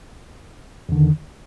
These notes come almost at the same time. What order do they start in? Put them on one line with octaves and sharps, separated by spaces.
E2 D3 D#3